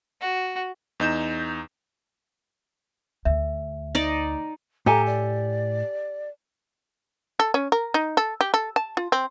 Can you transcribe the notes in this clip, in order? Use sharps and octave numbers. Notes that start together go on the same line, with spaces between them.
F#4
E2 D#4 G6 E7
D2 E5
D#4 D5
A2 G4 A4 G#5 A#5
D5
A4
C#4
A#4
D#4
A4
G4
A4
A5
F4
C4